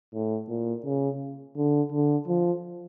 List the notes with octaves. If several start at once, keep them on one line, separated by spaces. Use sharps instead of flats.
A2
A#2
C#3
D3
D3
F3